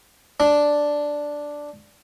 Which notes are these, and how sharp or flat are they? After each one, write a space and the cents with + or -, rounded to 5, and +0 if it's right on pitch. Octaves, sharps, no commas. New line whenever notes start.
D4 +0